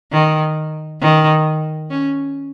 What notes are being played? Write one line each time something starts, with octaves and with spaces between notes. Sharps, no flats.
D#3
D#3
C#4